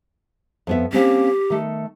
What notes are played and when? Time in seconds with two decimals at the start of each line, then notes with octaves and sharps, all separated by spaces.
0.67 F2 B3 E5
0.93 A#3 C4 C#4 G4
1.50 D#3 A3